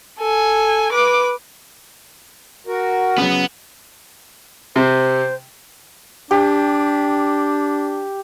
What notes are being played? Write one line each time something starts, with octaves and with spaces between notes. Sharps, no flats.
A4 G#5
B4 D6
F#4 A#4
C#3 F#3 B3
C3 C5
D4 G4